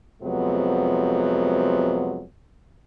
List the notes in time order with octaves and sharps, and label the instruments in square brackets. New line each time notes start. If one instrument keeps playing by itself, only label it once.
[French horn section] F2 C3 F#3 G#3 B3